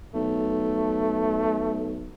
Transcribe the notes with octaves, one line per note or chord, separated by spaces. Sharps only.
B1 A3